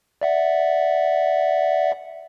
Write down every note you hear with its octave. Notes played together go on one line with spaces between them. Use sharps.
D5 E5 F#5